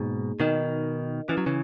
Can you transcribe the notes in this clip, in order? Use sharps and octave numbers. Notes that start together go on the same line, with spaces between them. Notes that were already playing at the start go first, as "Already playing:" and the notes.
Already playing: G#2 B2 A#3 D#4 G#4
B2 D#3 D#4 A#4 D#5
E3 C#4 E4 B4
F#3
C#3 E3